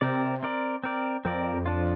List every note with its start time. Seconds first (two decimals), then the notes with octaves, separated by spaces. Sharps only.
0.01 C3 C4 A#4 D5
0.43 C4 A#4 D5
0.84 C4 A#4 D5
1.25 F2 C4 A#4 D5
1.66 F3 D4 F4